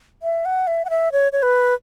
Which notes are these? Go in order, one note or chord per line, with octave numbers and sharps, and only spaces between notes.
E5
F#5
E5
F#5
E5
C#5
C#5
B4